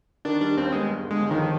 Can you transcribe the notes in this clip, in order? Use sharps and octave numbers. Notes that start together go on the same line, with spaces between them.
D#3 D4
G3 D4
D#2 C4
G#3 B3
G2
D3
G#3
G1
D#3
F3